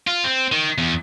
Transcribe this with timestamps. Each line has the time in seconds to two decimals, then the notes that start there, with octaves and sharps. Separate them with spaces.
0.07 F4
0.24 C4
0.52 D#3
0.78 E2